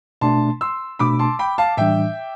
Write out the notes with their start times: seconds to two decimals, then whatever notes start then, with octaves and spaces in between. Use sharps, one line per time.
0.21 B2 A3 D4 A5 C6
0.61 C6 E6
0.99 B2 A3 D4 B5 D6
1.19 A5 C6
1.39 G5 B5
1.58 F5 A5
1.77 A2 E3 G3 D4 E5 G5